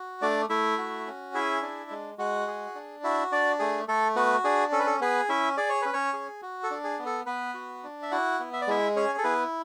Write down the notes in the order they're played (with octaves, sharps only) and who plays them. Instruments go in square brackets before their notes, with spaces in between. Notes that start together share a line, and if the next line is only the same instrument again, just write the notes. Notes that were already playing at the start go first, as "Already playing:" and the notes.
Already playing: [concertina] F#4
A3 D4 D5
A3 E4 E5
F#4
C#4
E4 G#4 E5
D4
G#3
G#3 F#4 F#5
G#4
D4
E4 F#4 E5
D4 D5
A3 G#4
A3 A4
B3 F#4 B4
D4 G#4
C#4 A4
B4
A4
B3 G#4 B4
C#4 E4 E5
G#4 D5
C#5
C#4 B4
C#4 C#5
G#4
F#4
A4
D4
G#4
B3
A4
B3 B4
F#4
D4
E5
E4 F#4 F#5
B3
E5
D5
G#3 E4 E5
C#4 G#4 C#5
A4
B3 E4 B4